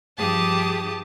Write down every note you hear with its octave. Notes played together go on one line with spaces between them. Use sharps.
G2 F3 G4 G#4 A5 D#6